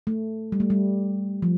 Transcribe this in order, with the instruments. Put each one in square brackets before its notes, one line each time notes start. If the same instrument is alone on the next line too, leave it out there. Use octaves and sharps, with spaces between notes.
[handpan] A3
G3
A3
G3
F3